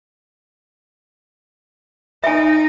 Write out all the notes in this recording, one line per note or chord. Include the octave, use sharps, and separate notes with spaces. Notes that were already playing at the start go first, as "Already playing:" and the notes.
D#4 E5 G#5